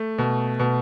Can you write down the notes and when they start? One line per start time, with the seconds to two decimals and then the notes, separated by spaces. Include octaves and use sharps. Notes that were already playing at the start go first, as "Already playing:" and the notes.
Already playing: A3
0.18 B2
0.60 B2